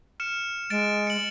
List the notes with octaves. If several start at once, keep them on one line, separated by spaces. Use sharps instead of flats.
F6 C#7 E7
G#3 A6 D7 E7
C#7 F#7